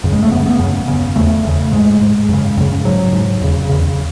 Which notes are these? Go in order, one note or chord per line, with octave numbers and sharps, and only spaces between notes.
F#2 C#3
G#3
A3
F#2 C#3 B3
B3
F#2 C#3
F#2 C#3
E2 C#3 A3
E2 C#3
G#2 G#3
G#2
F#2 C#3
F#2 C#3
G#2 F#3
G#2
E2 C#3
E2 C#3